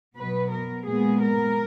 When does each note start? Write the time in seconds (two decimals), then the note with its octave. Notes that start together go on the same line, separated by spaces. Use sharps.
0.16 B2 F#3 B3 B4
0.51 A#4
0.86 A#2 G#3 B3 G#4
1.23 A#4